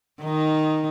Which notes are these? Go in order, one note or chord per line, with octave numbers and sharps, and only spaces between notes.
D#3 D#4